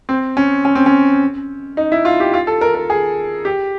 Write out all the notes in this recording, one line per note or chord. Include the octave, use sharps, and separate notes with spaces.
C4
C#4
C#4
C4
C#4
D#4
E4
F4
G4
F4
A4
A#4
A#4
G#4
G4